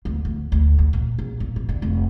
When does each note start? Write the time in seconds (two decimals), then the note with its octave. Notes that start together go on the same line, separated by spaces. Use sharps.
0.05 D2
0.25 D2
0.52 D2
0.79 D2
0.93 A#2
1.19 A#1
1.40 A#2
1.56 E3
1.69 D3
1.82 F1